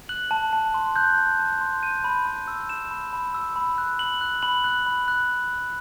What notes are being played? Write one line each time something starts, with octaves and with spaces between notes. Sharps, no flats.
F#6 F#7
A5
A5
C6
F#6 G6
A5
A5
C6
G6 D#7
B5
B5
E6
G6 E7
B5
B5
E6
B5
F#6
B5 F#7
F#6
B5 F#7
F#6
B5
F#6